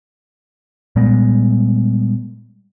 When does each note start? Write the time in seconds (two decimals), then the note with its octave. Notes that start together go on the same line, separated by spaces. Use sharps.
0.96 A#2 G3 G#3 B3